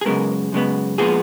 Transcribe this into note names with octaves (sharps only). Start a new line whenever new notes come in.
G#4
F#2 C#3 G#3 B3 A#4
F#2 C#3 G#3 B3
A#2 F3 G#3 B3 G#4